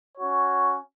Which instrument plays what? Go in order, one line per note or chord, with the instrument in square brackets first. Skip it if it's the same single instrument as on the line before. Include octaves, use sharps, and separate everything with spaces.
[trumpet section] C#4 F#4 C#5